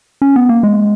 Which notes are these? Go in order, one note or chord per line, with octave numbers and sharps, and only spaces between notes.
C#4
B3
A#3
G#3